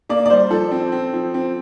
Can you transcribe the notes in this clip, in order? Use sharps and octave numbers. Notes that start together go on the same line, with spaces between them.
A#3 D5
D5
G3 C5
F3 A4
C4
C4
F3
C4